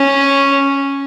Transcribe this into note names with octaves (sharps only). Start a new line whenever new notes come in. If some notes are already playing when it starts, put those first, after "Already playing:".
Already playing: C#4